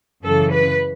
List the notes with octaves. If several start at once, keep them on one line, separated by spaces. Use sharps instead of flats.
F#2 C#3 E3 A4
B4